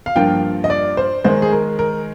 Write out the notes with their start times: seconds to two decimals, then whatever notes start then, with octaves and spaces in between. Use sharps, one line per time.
0.06 F5
0.16 G2 F3 A#3 F4 G5
0.64 D#5
0.70 D5
0.97 C5
1.24 D#3 G#3 D#4 C5
1.42 G#4
1.52 A#4
1.79 A#4